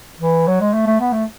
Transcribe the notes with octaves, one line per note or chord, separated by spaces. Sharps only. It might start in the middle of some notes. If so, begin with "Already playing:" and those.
E3
F#3
G#3
A3
A3
B3
A3